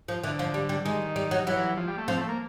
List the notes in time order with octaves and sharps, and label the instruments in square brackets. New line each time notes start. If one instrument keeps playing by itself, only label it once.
[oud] F3
[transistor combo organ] D3 [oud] E3
[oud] F3
G3
G3
[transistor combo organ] D#3 [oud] G#3
[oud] G3
F#3
[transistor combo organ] E3 [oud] F#3
[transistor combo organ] F3
G3
A3
[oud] F3 [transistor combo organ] C4
[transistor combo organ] A3
A#3